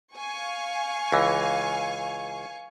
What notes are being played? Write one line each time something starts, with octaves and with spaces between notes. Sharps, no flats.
F5 G#5 C#6
C#2 E3